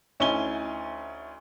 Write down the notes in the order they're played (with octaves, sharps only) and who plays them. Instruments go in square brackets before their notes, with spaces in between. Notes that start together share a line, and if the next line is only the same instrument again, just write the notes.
[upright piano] D2 C#4 D#4 E4 G#5 G7